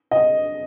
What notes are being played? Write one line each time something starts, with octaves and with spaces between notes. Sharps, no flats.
D#5